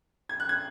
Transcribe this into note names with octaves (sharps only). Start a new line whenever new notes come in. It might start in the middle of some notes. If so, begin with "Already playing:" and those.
G#6
F#6
G#6